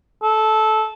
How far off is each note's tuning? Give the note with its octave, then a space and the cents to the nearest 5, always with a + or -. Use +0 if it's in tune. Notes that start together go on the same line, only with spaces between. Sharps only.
A4 -15